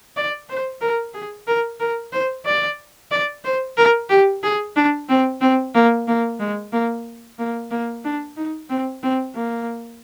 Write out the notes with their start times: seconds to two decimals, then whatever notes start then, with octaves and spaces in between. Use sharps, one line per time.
0.17 D5
0.49 C5
0.81 A#4
1.14 G#4
1.47 A#4
1.80 A#4
2.13 C5
2.46 D5
3.11 D5
3.45 C5
3.77 A#4
4.10 G4
4.44 G#4
4.76 D4
5.09 C4
5.41 C4
5.75 A#3
6.08 A#3
6.40 G#3
6.73 A#3
7.39 A#3
7.71 A#3
8.04 D4
8.37 D#4
8.70 C4
9.03 C4
9.35 A#3